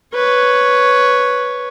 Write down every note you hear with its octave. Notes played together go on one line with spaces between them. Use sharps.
B4 C#5